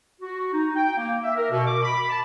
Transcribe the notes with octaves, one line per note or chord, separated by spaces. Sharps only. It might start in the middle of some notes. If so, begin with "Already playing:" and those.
F#4
D#4
G5
A#3
E5
A#4
B2
D6
B5
A5